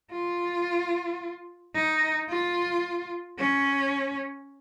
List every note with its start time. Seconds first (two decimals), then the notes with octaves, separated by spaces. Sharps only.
0.11 F4
1.75 D#4
2.30 F4
3.39 C#4